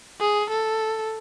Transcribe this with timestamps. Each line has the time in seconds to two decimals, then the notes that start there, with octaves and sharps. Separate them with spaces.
0.20 G#4
0.50 A4